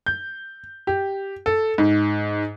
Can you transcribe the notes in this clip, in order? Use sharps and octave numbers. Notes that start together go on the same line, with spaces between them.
G6
G4
A4
G#2